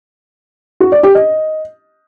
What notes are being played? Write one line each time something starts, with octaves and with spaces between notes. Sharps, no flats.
F#4
D5
G4
D#5